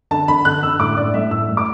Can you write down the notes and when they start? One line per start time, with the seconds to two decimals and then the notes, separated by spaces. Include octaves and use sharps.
0.11 D3 A5
0.28 D3 B5
0.45 D3 F#6
0.63 D3 E6
0.79 A2 D6
0.97 A2 D5
1.14 A3 E5
1.31 A2 E6
1.48 A3
1.57 D6